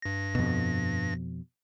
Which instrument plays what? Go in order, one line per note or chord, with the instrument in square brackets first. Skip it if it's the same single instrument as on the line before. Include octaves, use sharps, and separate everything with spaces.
[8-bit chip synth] G2 A#6
[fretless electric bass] F2 B2